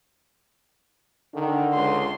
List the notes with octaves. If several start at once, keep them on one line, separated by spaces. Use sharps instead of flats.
D3 D#3
C#2 C6